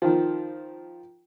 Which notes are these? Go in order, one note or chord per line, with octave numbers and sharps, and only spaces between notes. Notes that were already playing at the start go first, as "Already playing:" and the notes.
D#3 F3